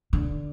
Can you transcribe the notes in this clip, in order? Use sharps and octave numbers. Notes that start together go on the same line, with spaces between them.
D3